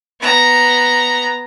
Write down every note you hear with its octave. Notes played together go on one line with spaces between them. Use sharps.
B3 A#5